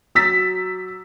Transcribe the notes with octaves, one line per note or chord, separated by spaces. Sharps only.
F#3 E6 A6 B6